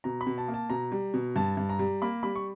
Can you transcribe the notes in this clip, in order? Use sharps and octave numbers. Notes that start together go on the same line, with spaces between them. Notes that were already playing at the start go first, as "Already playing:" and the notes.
B2 A#5
B5
B2
A5
A#3
A5
B2 A#5
G3
B2
G2 A5
G2
A#5
G3
A#3 B5
G3 B5
C#6